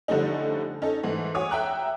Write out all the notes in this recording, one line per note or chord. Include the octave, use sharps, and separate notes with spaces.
D3 F3 G3 A3 C#4 D#4
C#4 D#4 A4
G#2 E3 A3
F#4 C#5 G#5 D6 D#6
E5 F#5 G5 A#5 F#6